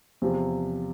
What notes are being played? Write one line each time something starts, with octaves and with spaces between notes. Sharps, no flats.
E2 C3 F3